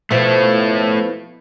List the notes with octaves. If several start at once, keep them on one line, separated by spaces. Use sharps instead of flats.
B2 F3 A3 E4